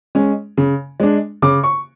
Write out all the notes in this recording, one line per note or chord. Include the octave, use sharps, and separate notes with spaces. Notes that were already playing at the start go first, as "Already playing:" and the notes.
G#3 C#4
C#3
G#3 D4
C#3 D6
C#6